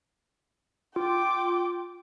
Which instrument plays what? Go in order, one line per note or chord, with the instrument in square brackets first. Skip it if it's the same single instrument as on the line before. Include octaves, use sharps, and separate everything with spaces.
[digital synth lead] F4 [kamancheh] G5 D6